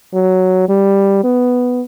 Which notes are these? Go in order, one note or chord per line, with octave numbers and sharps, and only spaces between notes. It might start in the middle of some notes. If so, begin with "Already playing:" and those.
F#3
G3
B3